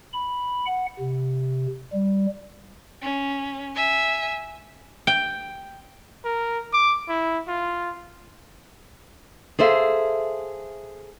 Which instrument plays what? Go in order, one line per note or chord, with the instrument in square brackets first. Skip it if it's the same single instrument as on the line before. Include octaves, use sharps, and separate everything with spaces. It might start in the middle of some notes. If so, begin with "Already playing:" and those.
[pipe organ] B5
F#5
C3
G3
[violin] C#4
E5 G#5
[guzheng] G5
[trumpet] A#4
D6
E4
F4
[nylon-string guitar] G#4 A4 C5 E5 F5